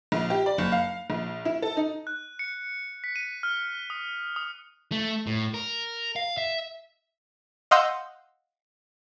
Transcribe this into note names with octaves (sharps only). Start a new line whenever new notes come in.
A#1
G4
D5
F#1
F5
A#1
E4
A4
D#4
F#6
C#7
B6
D#7
F6
D#6
D#6
A3
A2
A#4
F5
E5
D#5 F5 F#5 C6 E6 G6